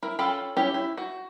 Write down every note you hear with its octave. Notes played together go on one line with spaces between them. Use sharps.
E4 A#4
C#4 F4 A4 G5 B5
C#4 E4 G4 C#5
E4
F#4